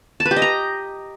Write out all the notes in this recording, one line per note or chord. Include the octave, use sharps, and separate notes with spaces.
A5
B4
G4
D#5
A#5